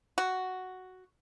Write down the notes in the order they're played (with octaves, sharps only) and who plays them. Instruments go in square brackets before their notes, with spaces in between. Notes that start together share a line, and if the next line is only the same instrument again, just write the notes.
[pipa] F#4